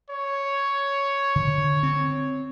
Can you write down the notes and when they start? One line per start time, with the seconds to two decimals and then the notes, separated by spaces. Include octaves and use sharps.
0.10 C#5
1.36 D3
1.83 C4